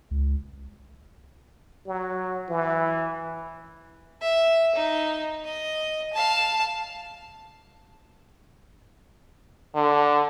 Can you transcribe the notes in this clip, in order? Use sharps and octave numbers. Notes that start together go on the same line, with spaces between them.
C#2
F#3
E3
E5
D#4
D#5
F5 A5
D3